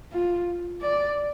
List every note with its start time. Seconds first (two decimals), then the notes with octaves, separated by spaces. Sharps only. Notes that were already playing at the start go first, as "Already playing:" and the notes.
0.13 F4
0.82 D5